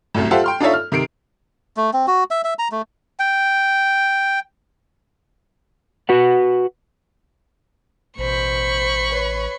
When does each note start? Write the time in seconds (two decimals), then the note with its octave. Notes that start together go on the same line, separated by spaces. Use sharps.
0.14 C2 F#2 A2
0.31 F4 G4 A4 C5 E5 F#5
0.44 G5 C6 F6
0.60 D4 D#4 F4 A4 C#5 E5
0.73 F6
0.92 C3 D#3 C7 D7
1.77 A3
1.93 C4
2.08 F#4
2.31 E5
2.44 E5
2.59 A#5
2.72 A3
3.20 G5
6.09 F#4 B4 F#5
8.18 A1 B2 C5 B5 C#6
9.10 B4 C#5